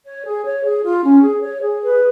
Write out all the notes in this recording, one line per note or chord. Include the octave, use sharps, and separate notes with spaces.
C#5
G#4
C#5
G#4
F4
C#4
G#4
C#5
G#4
B4